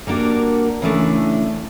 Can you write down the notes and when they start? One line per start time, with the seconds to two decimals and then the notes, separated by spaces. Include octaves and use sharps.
0.07 G3 A#3 D4 F#4 A#4
0.82 C#3 E3 A3 D4